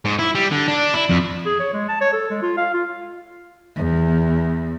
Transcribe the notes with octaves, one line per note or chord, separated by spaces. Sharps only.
G#2
E4
G3
D3
D4
E4
F2
G#4
C#5
G#3
A5
C#5
A4
G#3
F4
F5
F4
E2